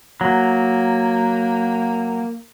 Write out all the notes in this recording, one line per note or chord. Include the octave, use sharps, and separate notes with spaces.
F#3 A#3